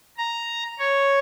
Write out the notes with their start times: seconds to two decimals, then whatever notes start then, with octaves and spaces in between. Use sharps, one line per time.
0.18 A#5
0.79 C#5